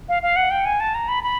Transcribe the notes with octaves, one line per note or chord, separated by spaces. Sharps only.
F5
F5
F#5
G5
G#5
A5
A#5
B5
B5